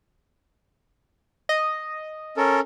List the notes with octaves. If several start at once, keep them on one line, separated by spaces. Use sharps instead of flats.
D#5
C#4 A4 A#4